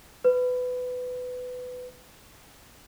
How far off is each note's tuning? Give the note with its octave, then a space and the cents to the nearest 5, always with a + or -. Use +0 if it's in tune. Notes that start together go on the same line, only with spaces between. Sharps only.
B4 +20